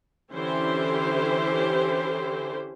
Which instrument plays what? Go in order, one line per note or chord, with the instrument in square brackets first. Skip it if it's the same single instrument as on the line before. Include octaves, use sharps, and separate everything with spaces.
[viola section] D3 E3 C#4 E4 G4 C5